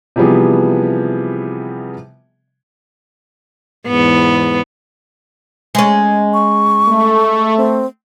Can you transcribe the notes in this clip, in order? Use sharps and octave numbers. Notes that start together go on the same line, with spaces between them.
C3 E3 F3 G3 B3 G#4
E2 G#2 B3
G#3 C#4
C#6
A3
C4